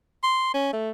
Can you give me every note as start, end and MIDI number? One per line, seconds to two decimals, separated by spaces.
0.23 0.50 84
0.54 0.69 61
0.73 0.91 57